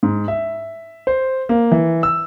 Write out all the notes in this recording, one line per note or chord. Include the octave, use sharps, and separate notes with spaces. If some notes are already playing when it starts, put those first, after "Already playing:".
G#2
E5
C5
A#3
E3
E6